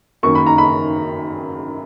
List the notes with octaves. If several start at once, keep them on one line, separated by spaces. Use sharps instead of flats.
F#2 D#3 A#3 C#6
B5
A#5
B5